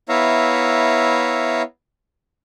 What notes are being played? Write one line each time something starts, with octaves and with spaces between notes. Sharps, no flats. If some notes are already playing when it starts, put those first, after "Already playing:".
B3 E4 C#5 E5 F5 A#5